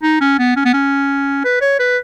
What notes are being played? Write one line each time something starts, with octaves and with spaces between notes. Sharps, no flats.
D#4
C#4
B3
C#4
B3
C#4
B4
C#5
B4